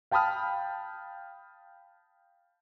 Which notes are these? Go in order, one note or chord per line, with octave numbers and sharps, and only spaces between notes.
F5 G5 A5 B5 D#6 F6